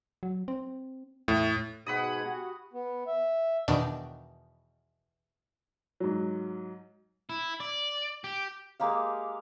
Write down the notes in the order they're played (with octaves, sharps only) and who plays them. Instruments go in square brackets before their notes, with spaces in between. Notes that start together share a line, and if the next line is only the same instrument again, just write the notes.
[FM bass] F#3
C4
[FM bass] E2 [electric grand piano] A2
[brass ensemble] G#2 B2 [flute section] G#4 G#6 [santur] F#5 B5 D#6
[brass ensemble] F#4 G4
[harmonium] B3
E5
[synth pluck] E2 B2 D#3 D4
[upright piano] G#2 F#3
[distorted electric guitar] E4
D5
G4
[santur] G#3 A#3 G4 F5